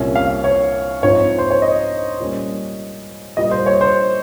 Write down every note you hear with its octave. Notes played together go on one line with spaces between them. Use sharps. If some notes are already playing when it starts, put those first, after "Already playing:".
Already playing: C2 A#2 G3 C#4
F5
C#5
G#2 F3 C4 D#4 C#5
C5
C#5
D#5
A#2 G3 C#4
A#2 G3 A#3 D#5
C5
C#5
C5